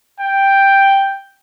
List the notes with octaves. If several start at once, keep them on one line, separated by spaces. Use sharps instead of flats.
G5